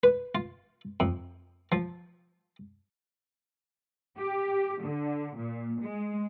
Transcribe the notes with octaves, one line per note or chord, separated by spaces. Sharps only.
B4
F4
F2
F3
G4
D3
A#2
G#3